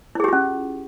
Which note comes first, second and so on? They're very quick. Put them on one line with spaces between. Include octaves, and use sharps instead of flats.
E4 G#4 G4 F4 C#4